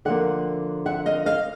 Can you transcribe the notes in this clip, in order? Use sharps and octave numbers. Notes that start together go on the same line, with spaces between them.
D3 F3 A#3 E5 F#5
E5 F#5
D#5 F5
D#5 F5